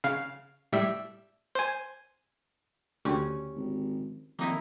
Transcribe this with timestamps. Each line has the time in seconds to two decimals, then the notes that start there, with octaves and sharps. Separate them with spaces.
0.04 C#3 F5
0.72 A2 G3 E5
1.55 C5 G#5
3.05 D2 C#3 C#4 D4 G4
3.55 G#1
4.39 F2 D#3 A#3 D#4 E4